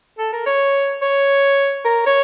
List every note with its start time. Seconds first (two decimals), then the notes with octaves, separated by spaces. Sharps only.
0.18 A4
0.33 A#4
0.46 C#5
1.02 C#5
1.85 A#4
2.06 C#5